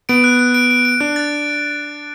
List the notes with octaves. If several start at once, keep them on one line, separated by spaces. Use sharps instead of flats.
B3 D7
F#6
F#6
D7
D7
D7
D4 F#6
A6